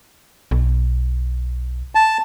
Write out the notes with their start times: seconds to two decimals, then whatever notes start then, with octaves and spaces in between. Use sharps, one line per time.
0.51 B1
1.95 A5